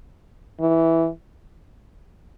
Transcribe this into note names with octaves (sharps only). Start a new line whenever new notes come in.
E3